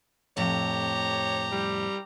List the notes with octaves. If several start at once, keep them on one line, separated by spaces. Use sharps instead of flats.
F2 A2 G4 C#5 A#5
G3